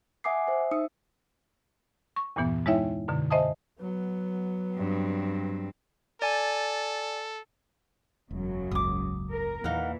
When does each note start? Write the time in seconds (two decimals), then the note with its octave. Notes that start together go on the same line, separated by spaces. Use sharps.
0.24 E5 F#5 G#5 D6 D#6 C7
0.47 C5 E5
0.71 D#4 D#6 E6 C#7
2.16 C#6
2.36 E2 G2 A#2 E3 B3
2.66 G#3 D#4 E4 C#5 E5 G5
3.08 F#2 B2 D3
3.30 C5 D#5 E5 G#5 A5 D#6
3.80 F#3 B3
4.76 G2 C4
6.22 A4 D5 G#5
8.31 E1 F#2 C#3 F#3
8.71 F#1 C#2 G#2 D6 D#6
9.31 A#4
9.64 E2 A#2 E3 D#4 F5 F#5